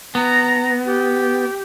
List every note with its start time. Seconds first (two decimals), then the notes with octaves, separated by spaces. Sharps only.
0.15 B3 A#5
0.86 G4